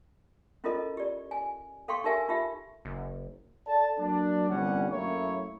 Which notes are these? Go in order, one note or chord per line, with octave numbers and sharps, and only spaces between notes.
C#4 E4 F4 A4 A#4 D#5
G4 D5
G#5
A4 F5 G5 C6 C#6
D#4 G4 A#4 E5 G#5
D#4 F4 G4 E5
F#1
A4 D5 A5
F#3 A#3 D4
G1 C2 G3 C#4 F#5
F#2 A3 A#3 E4 C#5